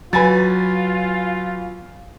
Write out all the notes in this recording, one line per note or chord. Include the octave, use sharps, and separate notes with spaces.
F#3 F4 B4 G#5 A6